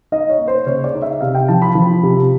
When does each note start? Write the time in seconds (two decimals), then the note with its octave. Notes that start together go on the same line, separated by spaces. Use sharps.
0.12 D#4 D#5
0.30 C#5
0.38 A#3
0.48 C5
0.66 C#3 C#5
0.84 D5
0.94 D#4
1.02 E5
1.21 C3 F5
1.35 G5
1.48 F3 A5
1.62 B5
1.75 F3
2.03 C3